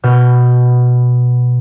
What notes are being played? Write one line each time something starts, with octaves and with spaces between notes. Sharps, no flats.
B2 F6 G6